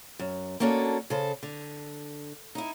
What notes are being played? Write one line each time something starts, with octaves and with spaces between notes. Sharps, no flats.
F#2
A#3 C#4 D4 F#4 A4
C#3 A4 C5
D3
D#4 E4